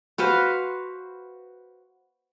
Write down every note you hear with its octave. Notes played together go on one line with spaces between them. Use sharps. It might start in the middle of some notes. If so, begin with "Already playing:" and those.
F#4 B4 C5 F5